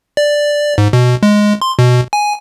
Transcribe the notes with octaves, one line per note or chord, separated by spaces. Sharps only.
D5
G#2
B2
G#3
C6
B2
G#5